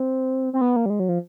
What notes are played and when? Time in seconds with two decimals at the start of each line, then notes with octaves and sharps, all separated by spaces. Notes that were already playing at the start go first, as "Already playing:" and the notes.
Already playing: C4
0.53 C4
0.61 B3
0.76 A#3
0.86 G3
0.90 G#3
1.00 F#3
1.09 F3